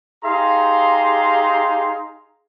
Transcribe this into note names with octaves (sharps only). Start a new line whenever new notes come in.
D#4 G4 G#4 F5 A#5 C6